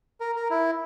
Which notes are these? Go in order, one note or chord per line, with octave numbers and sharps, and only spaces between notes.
A#4
A#4
E4